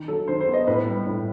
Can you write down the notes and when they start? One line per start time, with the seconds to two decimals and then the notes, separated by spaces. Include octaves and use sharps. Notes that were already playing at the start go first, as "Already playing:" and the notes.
Already playing: D#3
0.08 F#3 A4
0.28 D#3 C5
0.41 C5
0.48 B3
0.54 D#5
0.67 A2 B4
0.86 G3
1.06 A2